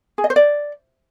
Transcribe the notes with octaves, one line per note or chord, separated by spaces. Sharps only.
G#4
D#5
C5
D5